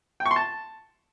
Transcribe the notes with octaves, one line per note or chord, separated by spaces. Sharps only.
G5
C#6
C6
A5